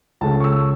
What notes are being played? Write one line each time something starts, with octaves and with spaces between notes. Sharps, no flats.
C#2 C#3 A3 C#4 A5
C#6
E6